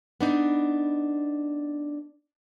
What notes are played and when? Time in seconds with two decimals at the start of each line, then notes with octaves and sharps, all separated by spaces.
0.21 B3 D4 D#4